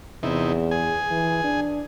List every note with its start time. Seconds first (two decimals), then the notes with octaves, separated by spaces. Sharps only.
0.23 E2 C3 D#4 E4
0.71 G#4 G#5
1.11 E3
1.44 D4